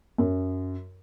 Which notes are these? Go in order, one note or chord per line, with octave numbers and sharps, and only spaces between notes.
F#2